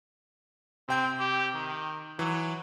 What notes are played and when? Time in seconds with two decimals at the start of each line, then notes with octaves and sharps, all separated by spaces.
0.88 C3 C4 G5 G6
1.19 G4
1.54 D#3
2.19 E3 F#3